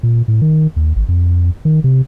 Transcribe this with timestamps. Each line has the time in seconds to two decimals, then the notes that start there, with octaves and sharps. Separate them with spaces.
0.03 A#2
0.28 A2
0.42 D#3
0.76 D#2
0.96 G#1
1.09 F2
1.65 D#3
1.84 C3